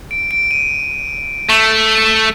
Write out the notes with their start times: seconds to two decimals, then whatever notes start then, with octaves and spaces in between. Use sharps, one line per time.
0.11 D7
0.31 D7
0.51 D#7
1.49 A3